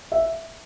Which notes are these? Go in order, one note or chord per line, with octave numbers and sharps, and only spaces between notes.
E5